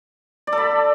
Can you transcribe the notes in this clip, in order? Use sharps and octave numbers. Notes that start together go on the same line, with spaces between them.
D5
A4
B5